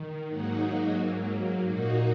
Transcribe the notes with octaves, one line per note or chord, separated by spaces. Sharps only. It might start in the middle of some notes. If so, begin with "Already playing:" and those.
Already playing: D#3
G#2 F#3 A#3 D#4 F#4
G#2 F#3 A#3
A#2 A#3 D#4 F#4